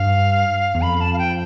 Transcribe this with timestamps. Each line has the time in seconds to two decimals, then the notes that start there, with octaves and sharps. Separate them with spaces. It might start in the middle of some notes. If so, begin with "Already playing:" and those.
Already playing: G2 F5
0.74 E2
0.82 F2 B5
1.01 A5
1.13 F5
1.18 G5